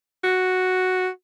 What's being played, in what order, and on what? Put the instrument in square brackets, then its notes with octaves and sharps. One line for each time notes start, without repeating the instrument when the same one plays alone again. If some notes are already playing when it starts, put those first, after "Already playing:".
[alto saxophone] F#4